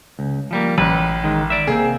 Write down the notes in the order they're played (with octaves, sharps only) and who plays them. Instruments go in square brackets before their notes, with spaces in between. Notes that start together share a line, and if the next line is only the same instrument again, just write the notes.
[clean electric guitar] C#2
F3 G3 A#3
[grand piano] A1 [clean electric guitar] B4
[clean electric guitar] D#3 G#3
D5 E5
[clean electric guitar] C3 A#3 C4 [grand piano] G#4